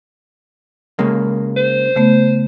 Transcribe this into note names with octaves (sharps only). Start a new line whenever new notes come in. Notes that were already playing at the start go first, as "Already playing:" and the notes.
C#3 G#3 A#3
C5
C#3 A3 B3